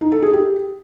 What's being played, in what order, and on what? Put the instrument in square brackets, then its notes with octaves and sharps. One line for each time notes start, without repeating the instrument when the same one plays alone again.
[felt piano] D#4
A4
G#4
G4